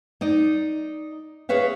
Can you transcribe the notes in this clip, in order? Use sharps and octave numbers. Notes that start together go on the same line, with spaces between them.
D#4 D5 D#5
G#4 B4 C#5 E5 F5